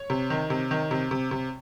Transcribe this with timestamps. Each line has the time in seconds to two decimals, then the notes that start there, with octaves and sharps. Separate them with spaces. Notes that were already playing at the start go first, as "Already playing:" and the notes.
Already playing: C#5
0.10 C3
0.30 D#3
0.50 C3
0.71 D#3
0.91 C3
1.11 C3
1.31 C3